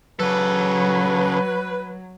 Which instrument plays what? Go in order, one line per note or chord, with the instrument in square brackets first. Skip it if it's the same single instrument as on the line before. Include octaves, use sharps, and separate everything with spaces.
[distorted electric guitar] C#3 A4 [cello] F#3 [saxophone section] B4